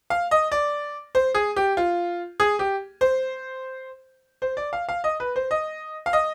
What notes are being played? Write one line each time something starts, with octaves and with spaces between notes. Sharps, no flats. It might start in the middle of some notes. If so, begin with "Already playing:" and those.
F5
D#5
D5
C5
G#4
G4
F4
G#4
G4
C5
C5
D5
F5
F5
D#5
B4
C5
D#5
F5
D#5